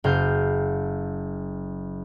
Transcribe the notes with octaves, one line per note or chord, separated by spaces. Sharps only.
F#1 F5 G6